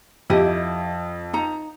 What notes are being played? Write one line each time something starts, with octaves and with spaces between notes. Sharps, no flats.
F2 E4 G4 D#5
D#4 A#5